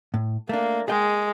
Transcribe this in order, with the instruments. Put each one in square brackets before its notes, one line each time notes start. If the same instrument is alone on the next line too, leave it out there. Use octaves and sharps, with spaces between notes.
[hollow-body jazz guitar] A2
[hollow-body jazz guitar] A3 D4 [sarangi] A#3
[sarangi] G#3 [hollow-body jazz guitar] G#4 D#5 G5